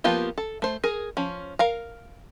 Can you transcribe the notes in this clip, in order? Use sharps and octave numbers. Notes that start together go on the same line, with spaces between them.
F3 A#3 B3 F4 G4
A4
A3 C5
G#4 A#4
F3 C#4
A#4 F5 A#5